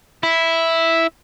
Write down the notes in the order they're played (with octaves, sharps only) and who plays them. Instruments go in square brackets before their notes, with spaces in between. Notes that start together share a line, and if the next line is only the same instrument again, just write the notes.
[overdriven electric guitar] E4